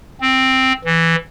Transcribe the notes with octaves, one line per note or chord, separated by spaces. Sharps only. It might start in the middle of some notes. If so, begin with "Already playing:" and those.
C4
E3